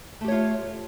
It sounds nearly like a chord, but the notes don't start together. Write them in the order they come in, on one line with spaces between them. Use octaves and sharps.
A3 G4 C#5 F4